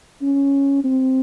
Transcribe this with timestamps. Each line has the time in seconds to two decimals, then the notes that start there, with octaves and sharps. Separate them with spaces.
0.22 C#4
0.84 C4